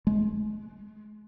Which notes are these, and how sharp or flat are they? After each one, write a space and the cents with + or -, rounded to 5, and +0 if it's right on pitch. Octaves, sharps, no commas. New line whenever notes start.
G#3 +35